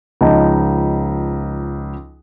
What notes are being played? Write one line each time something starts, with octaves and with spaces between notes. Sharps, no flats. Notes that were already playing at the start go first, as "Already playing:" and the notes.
C#2 F3 D#4 D#5 A5